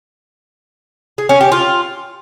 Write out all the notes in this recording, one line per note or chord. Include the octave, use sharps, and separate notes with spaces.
G#4
C#4
G4
F4